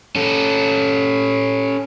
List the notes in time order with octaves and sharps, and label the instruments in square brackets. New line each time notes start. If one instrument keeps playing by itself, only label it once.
[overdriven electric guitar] C#4 A4